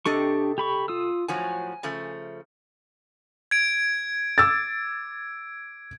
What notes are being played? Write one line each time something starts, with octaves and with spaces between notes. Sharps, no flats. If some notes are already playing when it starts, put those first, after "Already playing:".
C3 D4 G4 A4 D#5 C#6
G4 B5 C#6
F4 D#6 E6
A2 F3 F#3 G#5
C#3 F3 A3
G#6 D7
D6 E6 A6